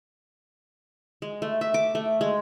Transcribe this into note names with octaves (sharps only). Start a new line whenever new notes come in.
G#3
A3
E5
D6
A3
G#3